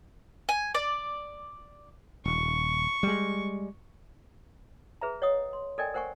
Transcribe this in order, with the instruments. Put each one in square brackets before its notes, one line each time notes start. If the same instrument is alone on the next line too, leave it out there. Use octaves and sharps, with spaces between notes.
[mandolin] G#5
D5
[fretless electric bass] D#1 [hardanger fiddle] C#6
[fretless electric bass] G3 G#3
[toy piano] G#4 B4 E5 A#5
C#5 D#5 F#5 D#6
C6
A4 A#4 D5 D#5 G5 G#5
A#4 C5 F#5 G#5 C#6